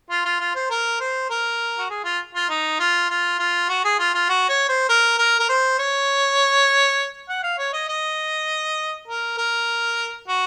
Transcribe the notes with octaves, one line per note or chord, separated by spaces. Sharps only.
F4
F4
F4
C5
A#4
C5
A#4
F#4
G#4
F4
F4
D#4
F4
F4
F4
F#4
G#4
F4
F4
F#4
C#5
C5
A#4
A#4
A#4
C5
C#5
F#5
F5
C#5
D#5
D#5
A#4
A#4
F#4